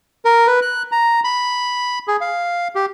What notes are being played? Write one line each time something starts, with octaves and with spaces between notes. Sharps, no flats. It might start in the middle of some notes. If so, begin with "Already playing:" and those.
A#4
B4
F#6
A#5
B5
G#4
F5
G4